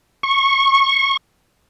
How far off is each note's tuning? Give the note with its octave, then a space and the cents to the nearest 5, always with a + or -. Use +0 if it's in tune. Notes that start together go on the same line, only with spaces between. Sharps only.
C#6 -20